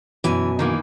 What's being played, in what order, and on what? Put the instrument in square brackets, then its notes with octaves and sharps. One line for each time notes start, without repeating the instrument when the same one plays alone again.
[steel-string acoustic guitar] F#2 B2 G#5 [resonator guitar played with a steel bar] E3
[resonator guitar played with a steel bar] D#3 E3 A#3